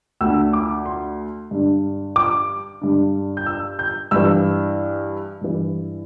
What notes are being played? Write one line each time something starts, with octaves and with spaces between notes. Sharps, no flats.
D2 D3 E6
D6
C6
G2 D3
D6
G2 D3
G6
E6
G6
G2 E3 E6
G2 E3